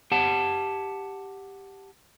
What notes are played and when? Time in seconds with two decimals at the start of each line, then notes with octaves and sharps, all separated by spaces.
0.12 G4 F#5 A5